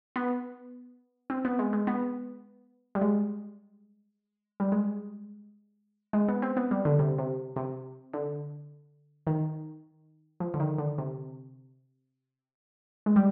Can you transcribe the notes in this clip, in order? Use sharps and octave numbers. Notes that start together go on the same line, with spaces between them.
B3
C4
B3
G#3
G#3
B3
G3
G#3
G3
G#3
G#3
B3
C4
B3
G3
D3
C3
C3
C3
D3
D#3
F3
D3
D#3
D3
C3
G#3
G3